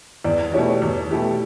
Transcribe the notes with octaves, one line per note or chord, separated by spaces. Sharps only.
E2 D5
B2 A3 E4 G4 C#5
E2
B2 A3 E4 G4